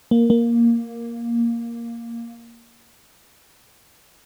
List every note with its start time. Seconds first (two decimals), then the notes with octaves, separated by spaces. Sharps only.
0.11 A#3
0.30 A#3